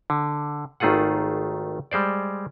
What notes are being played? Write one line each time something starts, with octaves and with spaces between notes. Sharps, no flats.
D3
G#1 D#3 A3 F4 G#4 F#5
G3 G#3 C5 D5